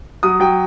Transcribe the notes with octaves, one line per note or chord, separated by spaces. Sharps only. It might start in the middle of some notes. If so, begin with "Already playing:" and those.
F#3 D#6
F#3 G5